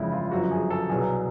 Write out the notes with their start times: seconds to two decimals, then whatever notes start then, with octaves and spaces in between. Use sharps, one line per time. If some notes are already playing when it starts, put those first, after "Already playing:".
Already playing: G1 F2 C#3 E3 G#3 E4
0.12 F4
0.31 G1 F#2 D3 F3 F#4
0.51 G#4
0.71 A4
0.90 C2 B2 F#3 G#4